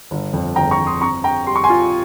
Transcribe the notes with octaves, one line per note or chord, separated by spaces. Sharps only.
G1
F2
G1 G5 A#5
A#5 C#6
G1
C6 D#6
C4 A#5 C#6
C4 G5 A#5
G3 C6
C#6
G#5 C6
F4